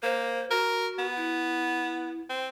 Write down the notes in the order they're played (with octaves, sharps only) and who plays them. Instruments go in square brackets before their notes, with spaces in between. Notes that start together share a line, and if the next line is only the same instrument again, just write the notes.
[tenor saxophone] A#3 [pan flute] C5
[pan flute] F#4 [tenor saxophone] A#4
[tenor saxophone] B3
[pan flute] E4
[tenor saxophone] C4